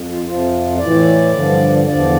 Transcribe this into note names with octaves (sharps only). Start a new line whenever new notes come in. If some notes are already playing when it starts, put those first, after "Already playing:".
Already playing: F2
F4
F2 C3 F3 F4
A2 E3 D5
G2 D3 F3
E2 D3 F3 D5